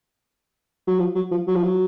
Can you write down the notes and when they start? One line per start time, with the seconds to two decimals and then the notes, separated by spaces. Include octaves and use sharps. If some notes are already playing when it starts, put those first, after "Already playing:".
0.87 F#3
0.99 F3
1.15 F#3
1.31 F3
1.47 F#3
1.55 F3
1.63 F#3